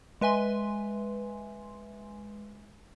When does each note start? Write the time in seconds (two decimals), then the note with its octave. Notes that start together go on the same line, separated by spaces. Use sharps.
0.21 G#3 B4 E5 G#5 C6